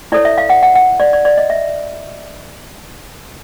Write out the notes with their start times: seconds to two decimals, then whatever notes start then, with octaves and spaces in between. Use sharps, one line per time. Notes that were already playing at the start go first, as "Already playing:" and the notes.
0.12 E4 A4 C#5 D5
0.25 E5
0.38 F5
0.50 F#5
0.63 F#5
0.75 F#5
1.00 D5
1.13 D5
1.25 D5
1.37 D#5
1.50 E5